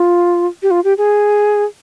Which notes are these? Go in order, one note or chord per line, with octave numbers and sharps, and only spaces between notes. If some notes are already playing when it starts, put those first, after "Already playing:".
Already playing: F4
G4
F4
G4
G#4